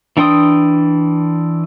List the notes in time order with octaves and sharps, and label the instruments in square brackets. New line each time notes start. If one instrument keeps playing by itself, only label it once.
[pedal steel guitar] E3 D4 G5 C6 D#6